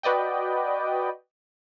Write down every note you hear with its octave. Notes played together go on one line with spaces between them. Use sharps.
F#4 B4 D5 D#5 G5